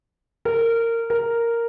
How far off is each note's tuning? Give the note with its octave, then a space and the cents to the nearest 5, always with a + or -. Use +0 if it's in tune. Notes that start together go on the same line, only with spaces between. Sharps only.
A#4 -20
A#4 -5